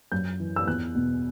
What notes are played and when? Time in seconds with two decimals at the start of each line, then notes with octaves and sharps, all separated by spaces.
0.12 F#2 G6
0.40 E3
0.56 E6
0.67 E2 F#6
0.95 B2